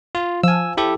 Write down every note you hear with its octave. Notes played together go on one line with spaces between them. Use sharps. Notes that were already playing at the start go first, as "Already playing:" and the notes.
F4
F3 G#5 E6
E4 G4 A4